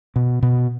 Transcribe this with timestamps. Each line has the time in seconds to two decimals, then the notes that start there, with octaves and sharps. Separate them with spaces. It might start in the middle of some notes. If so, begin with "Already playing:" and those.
0.16 B2
0.43 B2